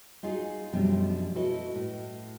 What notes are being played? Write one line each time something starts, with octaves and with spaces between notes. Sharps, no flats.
D#4 F4 F#4 G#4
F#2 B2 F3 G3 A3 D4
E4 F#4 A4 B4 D#5
A2